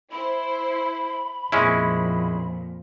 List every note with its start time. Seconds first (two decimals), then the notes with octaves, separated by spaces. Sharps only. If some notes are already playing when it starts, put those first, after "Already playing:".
0.11 E4 C5 B5
1.52 F2 A#2 F3 G#3 C#4 E4